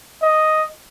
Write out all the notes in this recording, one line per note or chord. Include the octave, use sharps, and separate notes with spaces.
D#5